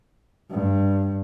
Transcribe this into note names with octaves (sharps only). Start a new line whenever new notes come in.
G2